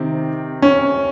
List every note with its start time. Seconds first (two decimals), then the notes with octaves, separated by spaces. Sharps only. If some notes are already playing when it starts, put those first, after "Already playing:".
Already playing: C3 D#3 C4
0.62 C#4